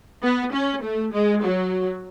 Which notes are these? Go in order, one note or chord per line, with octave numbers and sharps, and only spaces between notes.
B3
C#4
A3
G#3
F#3